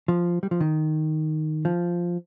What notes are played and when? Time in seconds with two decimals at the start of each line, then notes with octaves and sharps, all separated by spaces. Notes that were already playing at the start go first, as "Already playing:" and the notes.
0.08 F3
0.43 G3
0.51 F3
0.60 D#3
1.65 F3